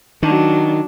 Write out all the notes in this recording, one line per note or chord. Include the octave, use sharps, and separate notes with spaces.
D#3 F#3 D4